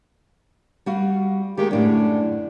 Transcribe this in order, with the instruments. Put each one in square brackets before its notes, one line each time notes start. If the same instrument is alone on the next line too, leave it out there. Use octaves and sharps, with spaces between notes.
[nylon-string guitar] G3 F#4 F5
[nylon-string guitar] D#3 G#3 A#3 [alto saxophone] G4
[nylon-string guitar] F#2 A2 D3 [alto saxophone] D4